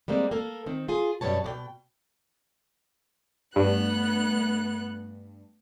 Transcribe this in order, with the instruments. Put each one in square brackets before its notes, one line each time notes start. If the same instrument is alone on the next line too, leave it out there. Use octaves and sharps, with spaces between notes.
[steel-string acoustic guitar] G3 G#3 A#3 C4
A#3 A4 A#4
D#3 C4
F4 G#4
F#2 B2 G3 C#5 A5
B2 D5 G5
[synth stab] G2 [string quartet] A3 B3 F#6